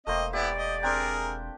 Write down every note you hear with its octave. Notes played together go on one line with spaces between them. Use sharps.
E1 A3 A#3 C4 C5 D#5
B3 E4 G4 D5
D#5
C4 D4 G#4 A#4 G5